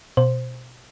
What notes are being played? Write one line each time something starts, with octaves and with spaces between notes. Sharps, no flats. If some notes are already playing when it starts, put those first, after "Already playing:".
B2 C5